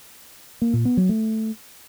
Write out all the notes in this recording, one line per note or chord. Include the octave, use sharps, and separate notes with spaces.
A#3
A#2
B3
F#3
A3